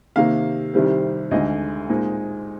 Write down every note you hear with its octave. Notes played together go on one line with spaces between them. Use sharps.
C3 D#3 A#3 F5
C2 C3 D#3 G3 C4
D2 D3 G#3 D#4 D#5
A#2 G#3 C4 D#4